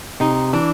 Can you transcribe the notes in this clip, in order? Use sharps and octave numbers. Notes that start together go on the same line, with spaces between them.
C3 D#4
E3 D4